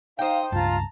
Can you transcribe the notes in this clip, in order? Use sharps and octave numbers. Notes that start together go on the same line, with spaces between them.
D#4 C5 F5 G5 D#6
C#2 G2 F4 A5 A#5